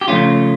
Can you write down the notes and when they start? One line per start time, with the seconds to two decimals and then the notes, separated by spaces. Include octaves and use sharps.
0.01 G4
0.08 C#3 F3 A3 C#4 F4